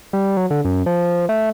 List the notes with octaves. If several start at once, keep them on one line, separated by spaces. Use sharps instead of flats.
G3
F#3
D3
F#2
F3
A3